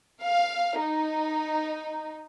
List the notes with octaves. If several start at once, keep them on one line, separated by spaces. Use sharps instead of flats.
F5
D#4